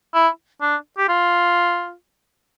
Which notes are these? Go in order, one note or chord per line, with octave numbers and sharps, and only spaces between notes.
E4
D4
G4
F4